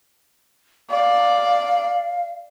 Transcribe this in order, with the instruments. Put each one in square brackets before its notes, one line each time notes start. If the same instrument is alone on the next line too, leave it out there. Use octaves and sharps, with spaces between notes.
[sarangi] D5 [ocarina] F5